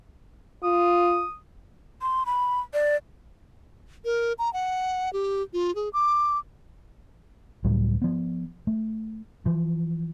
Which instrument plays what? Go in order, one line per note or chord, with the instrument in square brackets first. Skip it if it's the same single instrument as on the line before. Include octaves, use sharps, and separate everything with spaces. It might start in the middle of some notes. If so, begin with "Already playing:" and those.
[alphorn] F4 [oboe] D#6
[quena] C6
B5
D5
[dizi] A#4
A#5
F#5
G4
F4
G#4
D6
[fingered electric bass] C#2 A2 F#3 G3
F3 B3
A3
E3 F3